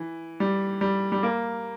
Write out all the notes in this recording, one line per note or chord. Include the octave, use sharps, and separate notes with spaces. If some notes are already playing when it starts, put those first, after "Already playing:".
Already playing: E3
G3
G3
G3
A#3